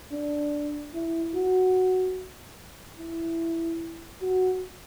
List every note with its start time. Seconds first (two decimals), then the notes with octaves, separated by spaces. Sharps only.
0.11 D4
0.94 E4
1.34 F#4
2.98 E4
4.22 F#4